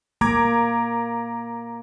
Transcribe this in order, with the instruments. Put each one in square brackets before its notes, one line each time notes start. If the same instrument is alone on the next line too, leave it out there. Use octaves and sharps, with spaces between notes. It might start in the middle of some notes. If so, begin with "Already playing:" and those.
[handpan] A#3 [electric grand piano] A#5 D6 G#6